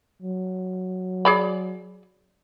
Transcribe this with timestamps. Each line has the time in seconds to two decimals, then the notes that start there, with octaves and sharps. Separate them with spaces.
0.22 F#3
1.25 G#4 D5 B5